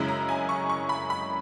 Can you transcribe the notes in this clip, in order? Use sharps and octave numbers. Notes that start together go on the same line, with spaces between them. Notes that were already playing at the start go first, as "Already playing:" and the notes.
Already playing: F#2 C#3 G#3 C#4 E4
A#5
G#5
C#6
C#6
B5
B5